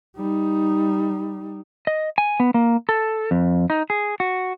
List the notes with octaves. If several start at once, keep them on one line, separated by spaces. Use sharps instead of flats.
G3 D#4
D#5
G#5
B3
A#3
A4
F2
D#4
G#4
F#4